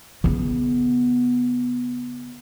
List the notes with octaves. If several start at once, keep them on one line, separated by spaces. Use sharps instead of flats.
C#3 B3